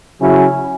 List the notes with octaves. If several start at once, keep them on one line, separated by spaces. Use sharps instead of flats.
C#3 F#3 C#4 E4